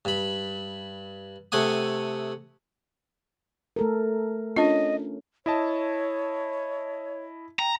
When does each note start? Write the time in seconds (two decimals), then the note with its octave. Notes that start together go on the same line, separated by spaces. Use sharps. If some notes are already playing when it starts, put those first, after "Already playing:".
0.05 G2 B5
1.52 C3 A3 F#5 G#5 D#6
3.76 A3 A4 A#4
4.56 C#4 D4 F4 D#5
5.46 E4 C#5 D#5 A5
7.59 G5 A#5